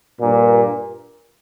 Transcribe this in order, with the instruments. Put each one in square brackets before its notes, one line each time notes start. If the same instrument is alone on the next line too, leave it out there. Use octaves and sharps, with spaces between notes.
[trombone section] G2 A#2